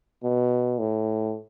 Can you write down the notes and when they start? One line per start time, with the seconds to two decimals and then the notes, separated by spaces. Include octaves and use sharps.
0.23 B2
0.79 A2